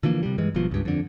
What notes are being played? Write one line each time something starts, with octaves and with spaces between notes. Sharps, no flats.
D3 E3 F3 A#3
C3 G3
G2 E3 G#3
G1 G2 B2 F3
C#2 G2
F2 D3